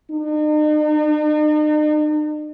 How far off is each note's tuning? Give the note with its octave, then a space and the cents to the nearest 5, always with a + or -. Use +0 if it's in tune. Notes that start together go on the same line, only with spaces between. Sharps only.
D#4 -45